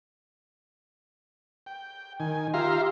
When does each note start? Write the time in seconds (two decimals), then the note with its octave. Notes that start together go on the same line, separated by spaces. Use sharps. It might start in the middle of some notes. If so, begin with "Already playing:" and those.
1.66 G5
2.20 D#3 G#5
2.54 F4 G4 E5 F5 A#5 C6